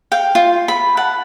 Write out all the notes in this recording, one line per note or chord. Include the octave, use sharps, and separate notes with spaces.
F5 G5
F4
B5
F#5 A5